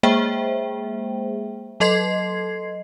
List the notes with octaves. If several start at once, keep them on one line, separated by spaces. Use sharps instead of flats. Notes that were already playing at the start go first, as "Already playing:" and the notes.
G#3 A#3 G#4 C5 E5 G5
F#3 A4 D#5 C6 G#6 C7